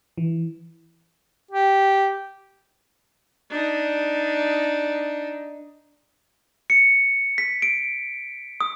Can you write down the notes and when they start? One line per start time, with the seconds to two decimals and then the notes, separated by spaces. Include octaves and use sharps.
0.18 E3
1.51 G4
3.51 D4 D#4
6.70 C#7
7.38 B6
7.62 D7
8.61 D#6